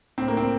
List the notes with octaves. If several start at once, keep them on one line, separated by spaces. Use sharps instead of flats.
A2 C4
A#3
C4